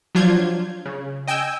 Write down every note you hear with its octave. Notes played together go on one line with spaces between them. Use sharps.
F3 F#3 D4 F4 G6 G#6
C#3
D#5 G5 G#5 E6 G6